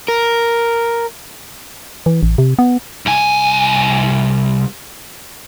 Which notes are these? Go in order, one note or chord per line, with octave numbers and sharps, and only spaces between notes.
A#4
E3
A1
C3
B3
C2 G#5